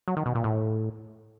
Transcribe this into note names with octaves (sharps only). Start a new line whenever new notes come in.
F#3
D#3
B2
A#2
A2